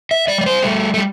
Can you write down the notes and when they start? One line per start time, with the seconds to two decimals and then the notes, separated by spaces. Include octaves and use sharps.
0.11 E5
0.28 G3 D5
0.41 D5
0.46 C5
0.62 G3 A3
0.94 A3
0.98 G3